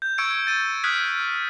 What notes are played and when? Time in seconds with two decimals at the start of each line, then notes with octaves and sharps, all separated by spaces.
0.02 G6
0.18 C#6 E6 G#6 C#7 D7
0.47 A6 D#7
0.84 D#6 F6 F#6 G#6 B6